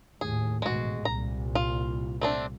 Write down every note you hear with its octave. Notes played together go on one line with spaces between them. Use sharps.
D#2 A2 G#4
A1 G#2 B2 G#3 F#4
C2 A#2 A#5
F4
A3 C4 D4